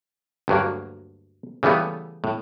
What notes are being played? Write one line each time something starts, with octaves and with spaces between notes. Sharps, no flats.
D2 G2 F#3 A#3
C#3 E3 G3 A3 B3
A2